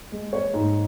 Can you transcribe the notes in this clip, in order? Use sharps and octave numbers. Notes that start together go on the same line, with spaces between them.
G#3
C#5
G#2